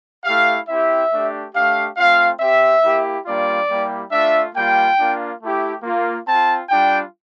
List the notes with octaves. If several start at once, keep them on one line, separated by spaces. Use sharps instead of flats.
A3 E4 G4 F5
C4 E4 G4 E5
A3 D4 G4
A3 D4 G4 F5
A3 C4 F4 F5
C4 G4 E5
A#3 E4 G4
G3 A#3 D4 F4 D5
G3 A#3 E4 G4
A3 D4 F4 E5
G3 A#3 F4 G5
A#3 D4 F4
A3 E4 G4
A#3 F4
C4 F4 A5
G3 D4 F4 G5